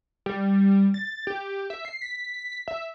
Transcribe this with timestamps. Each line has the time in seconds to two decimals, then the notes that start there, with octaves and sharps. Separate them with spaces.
0.26 G3
0.94 A6
1.27 G4
1.70 E5
1.85 C7
2.02 B6
2.68 E5